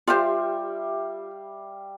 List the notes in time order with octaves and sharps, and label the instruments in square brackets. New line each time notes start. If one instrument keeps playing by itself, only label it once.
[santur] G3 E5 F5 [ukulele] F4 G4 C5